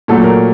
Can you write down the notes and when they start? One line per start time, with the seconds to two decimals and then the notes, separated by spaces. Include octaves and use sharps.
0.08 A#2 F#3 A3 A4
0.24 A#4